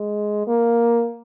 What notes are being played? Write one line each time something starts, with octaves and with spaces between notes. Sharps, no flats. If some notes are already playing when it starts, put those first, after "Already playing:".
Already playing: G#3
A#3